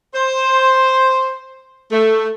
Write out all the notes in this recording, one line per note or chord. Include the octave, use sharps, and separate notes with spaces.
C5
A3